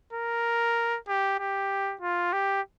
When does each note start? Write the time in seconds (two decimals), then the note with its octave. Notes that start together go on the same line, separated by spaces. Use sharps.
0.13 A#4
1.08 G4
1.39 G4
2.01 F4
2.33 G4